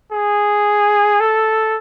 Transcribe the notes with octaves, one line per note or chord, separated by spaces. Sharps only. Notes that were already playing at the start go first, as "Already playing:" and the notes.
G#4
A4